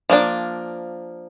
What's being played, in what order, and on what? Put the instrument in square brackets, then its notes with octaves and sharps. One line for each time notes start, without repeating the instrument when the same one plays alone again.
[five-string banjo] F3 A#3 D4